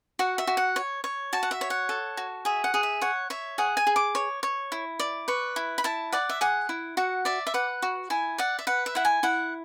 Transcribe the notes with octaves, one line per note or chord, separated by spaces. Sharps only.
F#4 F#5
E5
F#4
F#5
C#5
C#5
F#4 A5
F#5
E5
C#5
F#5
A4
F#4
G#4 E5
F#5
G#4
E5
C#5 F#5
C#5 E5
G#4 F#5
G#5
G#4
D6
C#5
C#5
E4
D5
B4 C#6
E4
B5
E4 A5
D5 F#5
E5
G#4 F#5
E4
F#4 F#5
D5 E5
E5
B4 F#5
F#4
E4 G#5
D5 F#5
E5
B4 F#5
E5
E4 F#5
G#5
E4 F#5